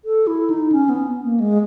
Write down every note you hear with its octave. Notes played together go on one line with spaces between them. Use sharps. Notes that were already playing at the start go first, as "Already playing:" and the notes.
A4
E4
D#4
C#4
B3
A#3
G#3